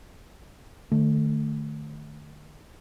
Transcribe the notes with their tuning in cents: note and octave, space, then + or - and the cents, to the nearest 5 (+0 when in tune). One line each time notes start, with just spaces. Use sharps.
D3 +45 A3 +0